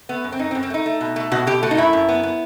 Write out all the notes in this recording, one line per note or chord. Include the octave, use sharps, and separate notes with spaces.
A3 B3
F#2
C4
F#2 D#4
C4
F#2
C4
A3 D#4
A3
B2
A3
B2 F#4
B2 G4
A3 F#4
D#4
F#2 E4
F#2
B3
B3